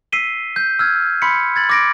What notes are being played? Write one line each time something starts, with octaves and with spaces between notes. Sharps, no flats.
E6 B6 C7 D#7 G7
G6
E6 F6 G#6
B5 C6 B6 C#7
G#6 A6 F#7
D6 A#6 D7